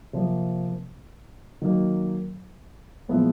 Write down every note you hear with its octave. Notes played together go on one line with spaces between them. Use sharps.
C3 F3 A#3
D#3 F#3 A#3
A#2 F3 G#3 B3 E4